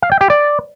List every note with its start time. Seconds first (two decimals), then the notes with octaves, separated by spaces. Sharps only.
0.02 F5
0.12 G5
0.21 G4
0.30 D5